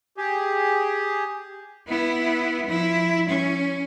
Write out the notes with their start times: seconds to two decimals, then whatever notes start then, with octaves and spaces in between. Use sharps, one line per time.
0.17 G4 G#4
1.87 B3 E4
2.66 F3 E4
3.29 C#4